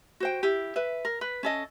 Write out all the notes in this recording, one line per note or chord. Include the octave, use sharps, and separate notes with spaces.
F#4 C5 G5
E4 G4
B4 E5
A#4
B4
C#4 A4 D#5